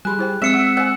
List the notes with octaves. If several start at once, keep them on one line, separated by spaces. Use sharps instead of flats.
G3 G4 G#4 G#5 B5 C6 F#6
E4 C5 G5
G#3 C4 E5 E6 C#7 E7
F#5
C5 F#5 G#5